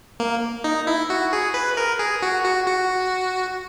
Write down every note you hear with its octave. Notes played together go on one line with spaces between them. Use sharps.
A#3
D#4
E4
F#4
G#4
B4
A#4
G#4
F#4
F#4
F#4